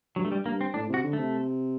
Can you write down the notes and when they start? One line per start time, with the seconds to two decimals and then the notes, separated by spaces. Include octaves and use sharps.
0.16 G2 F#3
0.25 A3
0.32 G3
0.46 G2 A#3
0.61 C4
0.74 A2 D4
0.89 C3 F#4
1.04 D3
1.13 A3
1.19 C3